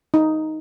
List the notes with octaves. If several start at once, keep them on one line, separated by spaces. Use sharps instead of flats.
D#4